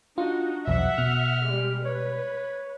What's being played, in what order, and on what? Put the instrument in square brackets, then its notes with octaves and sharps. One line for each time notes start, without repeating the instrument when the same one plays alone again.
[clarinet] D4 [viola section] D#4 F#4 [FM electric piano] F4
[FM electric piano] B1 E2 [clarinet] F3 [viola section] E5 F#5
[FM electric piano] B2 [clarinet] F6
[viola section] G3 G#3 G4
[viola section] B4 [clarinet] C#5